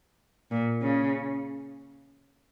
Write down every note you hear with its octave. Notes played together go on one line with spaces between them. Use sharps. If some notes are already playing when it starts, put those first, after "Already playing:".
A#2
C#3